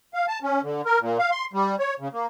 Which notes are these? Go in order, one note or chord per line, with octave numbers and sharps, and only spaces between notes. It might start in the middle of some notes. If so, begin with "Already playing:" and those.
F5
A5
C#4
D3
A#4
A#2
F5
C6
G3
C#5
C#3
A#3